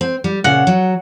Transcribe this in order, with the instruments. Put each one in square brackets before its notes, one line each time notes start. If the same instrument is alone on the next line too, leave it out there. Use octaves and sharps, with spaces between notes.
[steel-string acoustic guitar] C4
G3
[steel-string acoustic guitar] A#2 C#3 [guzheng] F#5
[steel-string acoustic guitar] F#3